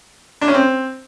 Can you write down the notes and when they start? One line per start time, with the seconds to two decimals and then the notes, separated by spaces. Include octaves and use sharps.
0.41 D4
0.48 C#4
0.54 C4